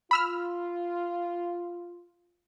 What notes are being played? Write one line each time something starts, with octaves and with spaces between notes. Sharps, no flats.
F4 B5 E6 F6